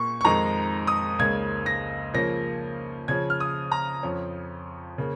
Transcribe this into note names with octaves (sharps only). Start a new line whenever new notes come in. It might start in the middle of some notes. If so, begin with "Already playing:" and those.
Already playing: A#2 A#3 C#6
C#6
F2 D#3 G#3 D#4 A#5
D#6
C#2 C#3 A#3 G#6
A#6
C#3 F3 A#3 C#4 A#6
C#3 F3 C#4 G#6
F6
D#6
A#5
F2 F3 C#4
C#3 A#3